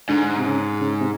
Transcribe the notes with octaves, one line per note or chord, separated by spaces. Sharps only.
G#2 D3
C3
C#3
C#3
C3